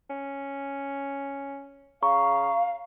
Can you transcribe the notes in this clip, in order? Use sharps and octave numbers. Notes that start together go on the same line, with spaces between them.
C#4
C#3 F5 A#5 C#6